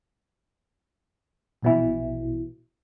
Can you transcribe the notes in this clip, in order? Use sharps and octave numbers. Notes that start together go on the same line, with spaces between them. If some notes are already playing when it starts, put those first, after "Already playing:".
A#1 B2 E3